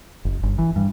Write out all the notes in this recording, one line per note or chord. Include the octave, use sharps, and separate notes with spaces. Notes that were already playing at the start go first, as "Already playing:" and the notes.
F#1
G1
E3
G2